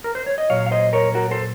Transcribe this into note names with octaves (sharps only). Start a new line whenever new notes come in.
A#4
C5
C#5
D#5
A#2 F#3 C#5 F5
F5
C5 D#5
A#4 C#5
F#4 A#4
A4 C5